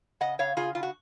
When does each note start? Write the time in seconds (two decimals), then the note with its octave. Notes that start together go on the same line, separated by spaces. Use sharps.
0.21 C#3 D#5 F#5
0.39 C#3 C#5 F5
0.57 C#3 F4 G#4
0.75 C#3 F4
0.83 F#4